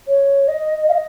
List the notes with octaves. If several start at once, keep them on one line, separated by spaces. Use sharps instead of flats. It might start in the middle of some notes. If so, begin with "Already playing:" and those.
C#5
D#5
F5
D#5